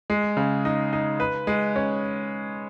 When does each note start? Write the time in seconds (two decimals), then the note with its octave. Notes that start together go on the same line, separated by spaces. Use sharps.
0.10 G#3
0.37 C#3
0.65 D#4
0.93 D#4
1.20 B4
1.47 G#3
1.76 C#4